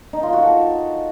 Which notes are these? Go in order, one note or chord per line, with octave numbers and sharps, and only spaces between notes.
D#4
F4
F#4
A4